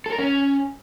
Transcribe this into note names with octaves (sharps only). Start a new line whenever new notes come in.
A4
A#4
C#4